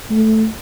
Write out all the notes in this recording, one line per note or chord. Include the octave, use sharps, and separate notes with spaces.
A3